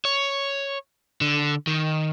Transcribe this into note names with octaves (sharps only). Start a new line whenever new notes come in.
C#5
D3
D#3